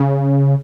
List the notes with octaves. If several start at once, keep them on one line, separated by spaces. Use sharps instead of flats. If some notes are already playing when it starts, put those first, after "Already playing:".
Already playing: C#3